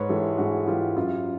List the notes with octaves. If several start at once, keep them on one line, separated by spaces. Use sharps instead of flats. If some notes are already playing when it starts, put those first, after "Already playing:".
Already playing: G#2 B4 C#5
E3 G#3 G4 A4
G#2 F#4 G#4
E3 G#3 F4 G4
F#2 F4 G4